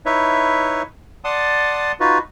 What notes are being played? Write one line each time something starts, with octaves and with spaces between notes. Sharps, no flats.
D#4 E4 B4 C#5 E5
D5 F#5 A5 C6 D#6
D#4 F4 F#4 B4